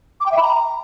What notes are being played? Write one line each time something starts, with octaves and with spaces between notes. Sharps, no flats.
D6
G5
E5
B5
A#5